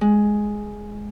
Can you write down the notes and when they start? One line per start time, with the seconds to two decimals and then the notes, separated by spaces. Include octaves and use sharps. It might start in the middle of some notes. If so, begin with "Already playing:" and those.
0.01 G#3